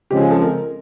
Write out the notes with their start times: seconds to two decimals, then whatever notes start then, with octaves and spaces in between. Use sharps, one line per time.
0.11 C#3 F3 G#3 C4 G4
0.21 G#4
0.31 A4
0.41 A#4